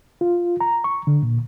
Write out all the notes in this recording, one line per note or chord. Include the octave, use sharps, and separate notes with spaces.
F4
A#5
C#6
D3
A#2